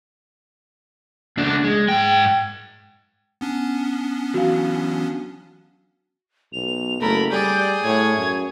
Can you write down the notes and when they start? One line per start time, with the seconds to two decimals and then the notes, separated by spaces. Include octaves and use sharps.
1.37 C#2 D4
1.64 G#3
1.88 G#2 G5
3.41 B3 C#4 D4
4.34 E3 F#3 F#4 F5
6.53 B1 F7
7.01 F#1 A3 A#4 B5
7.32 G3 G#4 D5 G6
7.83 A2 C#5 G#6
8.17 F#2